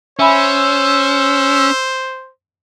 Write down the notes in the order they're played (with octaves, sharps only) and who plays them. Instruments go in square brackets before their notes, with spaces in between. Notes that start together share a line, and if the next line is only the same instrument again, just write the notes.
[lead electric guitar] C#4 [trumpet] C5 [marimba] E5 G#5 B5 [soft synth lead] E6